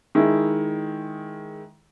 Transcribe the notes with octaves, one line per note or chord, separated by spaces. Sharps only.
D#3 G#3 E4